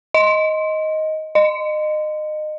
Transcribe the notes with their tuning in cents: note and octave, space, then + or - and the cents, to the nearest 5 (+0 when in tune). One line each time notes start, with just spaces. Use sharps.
D#5 +10
D#5 -25